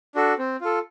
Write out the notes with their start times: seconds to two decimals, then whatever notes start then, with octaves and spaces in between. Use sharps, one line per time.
0.15 D4 F#4 A4
0.38 C4
0.61 F4 A4